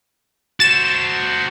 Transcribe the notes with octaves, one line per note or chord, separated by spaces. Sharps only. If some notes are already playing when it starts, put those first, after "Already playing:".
F#4 C5 A6 E7